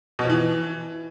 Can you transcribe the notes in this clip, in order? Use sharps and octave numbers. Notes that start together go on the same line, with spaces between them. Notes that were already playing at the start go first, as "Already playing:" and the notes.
B2
F3
E3